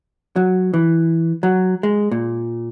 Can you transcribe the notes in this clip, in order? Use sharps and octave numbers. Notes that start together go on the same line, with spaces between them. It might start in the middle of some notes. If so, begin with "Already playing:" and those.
F#3
E3
F#3
G#3
A#2